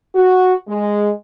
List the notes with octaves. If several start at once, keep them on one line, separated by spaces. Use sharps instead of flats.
F#4
G#3